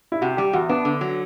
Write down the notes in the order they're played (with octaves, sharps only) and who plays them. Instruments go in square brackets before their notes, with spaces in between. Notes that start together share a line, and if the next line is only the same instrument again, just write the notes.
[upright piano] E4
[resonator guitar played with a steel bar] C3 [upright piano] F#4
[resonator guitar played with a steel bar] G3 [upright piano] G4
[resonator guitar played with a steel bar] E2 [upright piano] F#4
[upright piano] B3 [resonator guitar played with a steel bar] D4
[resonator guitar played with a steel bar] D3
F#3